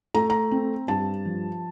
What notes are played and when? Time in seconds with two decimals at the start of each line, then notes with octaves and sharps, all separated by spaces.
0.14 A3 A#5
0.30 A#5
0.51 C4
0.88 G2 A5
1.25 F3